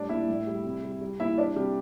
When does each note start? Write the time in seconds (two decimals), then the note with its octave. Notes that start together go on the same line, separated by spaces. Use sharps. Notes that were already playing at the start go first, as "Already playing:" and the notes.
Already playing: A2 G3 D4 D5
0.09 A#2 E4 E5
0.28 A2
0.47 G3
0.64 C3
0.83 G3
1.01 G3
1.20 A#2 E4 E5
1.38 G3 D4 D5
1.56 C3 G3 G4